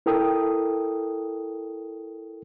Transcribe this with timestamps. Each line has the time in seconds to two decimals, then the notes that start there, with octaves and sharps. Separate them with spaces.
0.06 E4 A4 A#4 G5 D#6